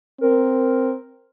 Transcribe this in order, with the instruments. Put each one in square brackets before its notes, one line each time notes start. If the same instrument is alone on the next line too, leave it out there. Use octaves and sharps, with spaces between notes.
[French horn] C4 [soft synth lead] A#4